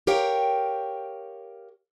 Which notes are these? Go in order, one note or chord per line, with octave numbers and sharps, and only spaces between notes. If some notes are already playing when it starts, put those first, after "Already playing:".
G4 A#4 C#5 F5 G5